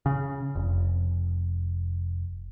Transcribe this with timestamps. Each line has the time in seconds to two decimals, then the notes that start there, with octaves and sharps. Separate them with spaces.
0.06 C#3
0.56 F1